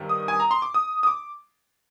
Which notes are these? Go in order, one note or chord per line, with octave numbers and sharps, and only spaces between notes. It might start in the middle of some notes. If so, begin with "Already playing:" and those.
Already playing: G2 D#3 G3 C4
D#6
G#5
A#5
C6
D6
D#6
D#6
D6